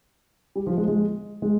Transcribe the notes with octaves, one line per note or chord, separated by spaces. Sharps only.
G3
F3
G#3
G#3
G#3